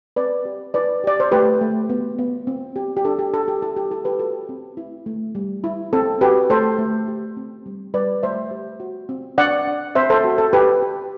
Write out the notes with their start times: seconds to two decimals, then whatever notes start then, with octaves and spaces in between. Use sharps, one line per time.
0.16 C4 B4 D5
0.45 G4
0.74 E4 B4 D5
1.04 G4 D5
1.20 C5
1.32 A3 G4 B4
1.61 A3
1.90 B3
2.19 B3
2.47 C4
2.76 G4
2.97 G4
3.05 D4 A4
3.19 G4
3.34 D4 A4
3.48 G4
3.62 E4 A4
3.77 G4
3.91 E4 A4
4.05 G4 B4
4.19 F#4 A4
4.49 C4
4.77 E4
5.06 A3
5.35 G3
5.64 E4
5.93 C4 A4
6.21 F#4 G4 B4
6.50 A3 A4 C5
6.79 A3
7.08 G4
7.37 C4
7.66 G3
7.94 G3 B4 D5
8.23 A3 C5 E5
8.51 G4
8.80 F#4
9.09 C4
9.38 D4 D5 F#5
9.67 D4
9.95 C4 C5 E5
10.10 A4 C5
10.24 F#4
10.38 A4
10.53 G4 B4
10.82 G4